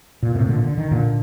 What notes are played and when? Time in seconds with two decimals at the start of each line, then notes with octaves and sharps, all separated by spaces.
0.23 A#2
0.35 A2 C3
0.49 A#2 D3
0.64 D3
0.78 D#3
0.91 A#2 D3